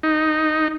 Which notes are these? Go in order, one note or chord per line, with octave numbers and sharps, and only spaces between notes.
D#4